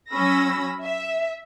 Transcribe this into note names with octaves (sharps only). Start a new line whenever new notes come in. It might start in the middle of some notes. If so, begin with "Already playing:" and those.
F#3 C#4 B5 E6 A#6
E5